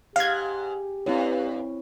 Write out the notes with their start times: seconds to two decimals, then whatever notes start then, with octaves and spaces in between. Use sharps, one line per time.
0.16 G#2 G4 F5 G#6
1.06 G2 C4 E4 C#5